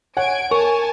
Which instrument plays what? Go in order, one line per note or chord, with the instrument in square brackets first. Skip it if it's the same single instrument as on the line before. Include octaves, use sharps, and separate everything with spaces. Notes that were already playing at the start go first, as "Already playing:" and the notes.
[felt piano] C#5 F#5 [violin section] G#5 G#6 D7
[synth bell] A#4 [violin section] G#5 A5 [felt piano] C#6